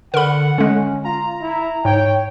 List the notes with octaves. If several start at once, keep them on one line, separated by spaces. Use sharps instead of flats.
D3 A#4 F#5 B5
D3 G#3 C#4
F4 A#5
E4
G#2 C#5 G5